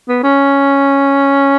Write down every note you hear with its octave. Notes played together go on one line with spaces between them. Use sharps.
B3
C#4